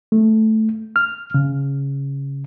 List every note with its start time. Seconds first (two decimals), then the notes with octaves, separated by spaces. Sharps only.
0.12 A3
0.96 F6
1.34 C#3